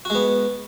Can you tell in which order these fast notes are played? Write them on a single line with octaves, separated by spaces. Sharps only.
F#4 G#3 B3